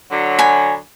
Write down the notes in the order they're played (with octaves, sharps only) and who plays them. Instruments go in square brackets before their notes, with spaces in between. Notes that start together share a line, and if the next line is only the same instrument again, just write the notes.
[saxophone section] D3 F#3
[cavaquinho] G#5 B5